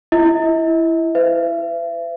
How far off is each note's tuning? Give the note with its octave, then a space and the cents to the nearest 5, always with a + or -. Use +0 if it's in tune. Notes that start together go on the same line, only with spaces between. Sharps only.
E4 +15 D#5 +45
C5 -45 E5 +35